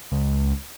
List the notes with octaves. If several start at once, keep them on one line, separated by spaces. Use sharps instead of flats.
C#2